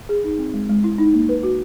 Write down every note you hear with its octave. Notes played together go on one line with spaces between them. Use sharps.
G#4
D#4
C4
G#3
G#3
E4
D#4
A#3
B4
F#4